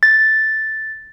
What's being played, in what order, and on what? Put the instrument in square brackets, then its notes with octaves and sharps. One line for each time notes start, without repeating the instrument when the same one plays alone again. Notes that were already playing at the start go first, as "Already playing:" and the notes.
[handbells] A6